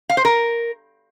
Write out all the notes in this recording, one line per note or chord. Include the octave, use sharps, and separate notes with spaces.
F5
C5
A#4